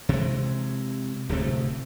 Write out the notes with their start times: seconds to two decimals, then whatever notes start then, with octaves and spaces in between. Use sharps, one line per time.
0.09 C3 E3 F3 G#3
1.29 D1 D2 C3 A3